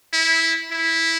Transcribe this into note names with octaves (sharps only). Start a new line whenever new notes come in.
E4
E4